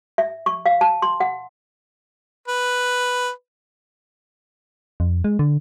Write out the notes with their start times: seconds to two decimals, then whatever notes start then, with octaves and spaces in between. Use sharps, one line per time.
0.18 E5
0.46 C#6
0.66 F5
0.81 A5
1.02 C6
1.20 F#5
2.48 B4
5.00 F2
5.24 G#3
5.39 D3